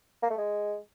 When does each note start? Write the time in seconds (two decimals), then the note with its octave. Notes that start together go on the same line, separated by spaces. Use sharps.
0.23 A#3
0.30 A3
0.38 G#3